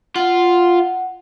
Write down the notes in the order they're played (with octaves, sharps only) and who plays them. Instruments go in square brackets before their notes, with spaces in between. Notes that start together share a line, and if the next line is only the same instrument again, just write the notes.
[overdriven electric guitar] F4 [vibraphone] F#5